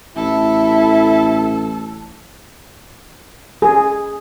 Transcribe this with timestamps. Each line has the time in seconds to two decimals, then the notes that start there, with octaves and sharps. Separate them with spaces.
0.16 A1 E4 A4
3.62 G#4